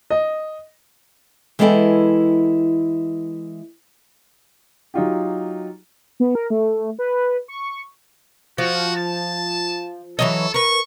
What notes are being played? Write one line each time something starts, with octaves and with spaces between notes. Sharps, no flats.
D#5
E3 G#3 B3 E4 A4 G5
F#3 D#4 F4 G4
B3
A#4
A3
B4
C#6
F3 F#4
A5
E3 F#3 A4 D#5
A#4 B4 C#6